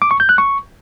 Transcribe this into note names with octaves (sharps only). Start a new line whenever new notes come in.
D6
C#6
G6
F#6
C#6